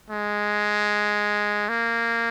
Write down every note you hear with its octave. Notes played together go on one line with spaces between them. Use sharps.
G#3
A#3